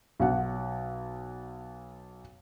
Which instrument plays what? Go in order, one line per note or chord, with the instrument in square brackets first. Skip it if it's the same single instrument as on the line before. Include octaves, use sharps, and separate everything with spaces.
[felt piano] B1 F#5